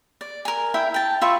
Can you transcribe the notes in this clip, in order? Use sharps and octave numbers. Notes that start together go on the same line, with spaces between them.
D5
A#4 G#5
E4 E5 G5
G5 A5
F4 E5 B5 C#6